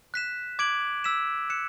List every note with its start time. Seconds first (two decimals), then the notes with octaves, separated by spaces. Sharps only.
0.14 F#6 B6 E7
0.59 D6 G#6 D7 F#7
1.04 E6 B6 E7
1.50 F#6 C#7 E7